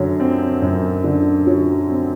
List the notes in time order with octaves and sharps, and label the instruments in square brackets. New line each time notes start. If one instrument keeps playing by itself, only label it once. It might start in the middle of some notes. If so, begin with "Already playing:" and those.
Already playing: [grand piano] F#2 D3 F#3
C4
F#2
D3
F#3
C4